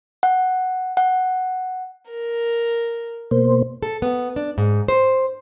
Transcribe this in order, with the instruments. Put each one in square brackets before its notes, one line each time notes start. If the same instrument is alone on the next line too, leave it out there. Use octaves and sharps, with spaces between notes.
[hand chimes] F#5
F#5
[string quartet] A#4
[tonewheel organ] B2 A#3 C5
[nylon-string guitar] A4
B3
D4
G#2
C5